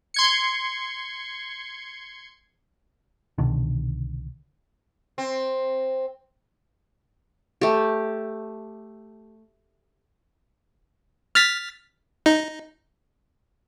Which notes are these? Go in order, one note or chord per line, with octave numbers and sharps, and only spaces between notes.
C6 G#6 C#7
C2 B2 D3 D#3
C4
A3 G4
F6 A6 B6
D#4